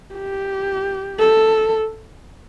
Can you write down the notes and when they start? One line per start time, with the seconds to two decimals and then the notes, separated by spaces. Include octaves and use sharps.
0.15 G4
1.19 A4